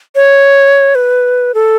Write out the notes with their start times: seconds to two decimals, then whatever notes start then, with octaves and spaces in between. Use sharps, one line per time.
0.15 C#5
0.95 B4
1.54 A4